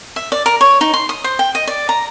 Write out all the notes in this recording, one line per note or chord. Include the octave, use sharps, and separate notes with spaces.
E5
D5
A#4
C#5
D#4
C6
D#6
C5
G5
D#5
D5
A#5